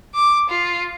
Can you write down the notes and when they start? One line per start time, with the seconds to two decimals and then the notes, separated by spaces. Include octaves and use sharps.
0.15 D6
0.49 F4